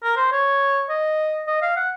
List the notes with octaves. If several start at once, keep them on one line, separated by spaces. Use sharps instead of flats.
A#4
C5
C#5
D#5
D#5
F5
F#5